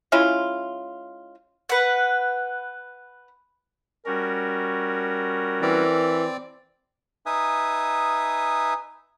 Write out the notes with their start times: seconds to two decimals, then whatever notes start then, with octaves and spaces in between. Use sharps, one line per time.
0.12 G#3 C#4 E4 F4
1.69 B4 F#5
4.06 G3 C#4 F#4 A#4
5.62 E3 C4 D5
7.26 D#4 B4 E5 G#5 D#6